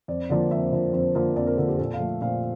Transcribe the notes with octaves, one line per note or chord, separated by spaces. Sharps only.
F2 D5
D3 F3 A#3 D5
F2 E5
D3 F3 A#3
F2
D3 F3 A#3
F2 D5
A#4
D3 F3 A#3 A4
G4
A#2 A4
F5
F3 A3
A#2 F5